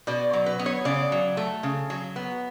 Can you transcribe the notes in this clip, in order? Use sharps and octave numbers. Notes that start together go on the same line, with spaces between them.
B2 D5
F#3
B4
B3
C#5
C#3 D5
F#3
A3
C#3
F#3
B3